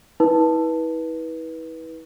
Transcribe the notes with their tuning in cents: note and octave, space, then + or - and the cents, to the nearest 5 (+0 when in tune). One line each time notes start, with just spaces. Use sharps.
E4 -40 B4 -20